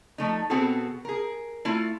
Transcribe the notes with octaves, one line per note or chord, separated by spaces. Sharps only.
F3 A3 D#4
B2 B3 C4 F#4 G#4 A4
G#4 A#4
A3 E4 F4